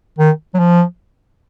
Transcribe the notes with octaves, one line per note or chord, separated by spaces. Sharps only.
D#3
F#3
F3